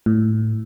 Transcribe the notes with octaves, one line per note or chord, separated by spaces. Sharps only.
A2